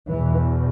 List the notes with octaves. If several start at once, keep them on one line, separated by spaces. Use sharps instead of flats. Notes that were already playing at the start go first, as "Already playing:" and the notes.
E2 B2 E3